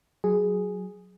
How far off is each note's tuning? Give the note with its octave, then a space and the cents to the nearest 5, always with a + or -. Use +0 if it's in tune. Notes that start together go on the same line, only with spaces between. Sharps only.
F#3 +0 G#4 +0